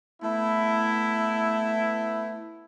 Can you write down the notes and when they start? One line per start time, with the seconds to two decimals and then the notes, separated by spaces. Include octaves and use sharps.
0.22 A3 B3 E4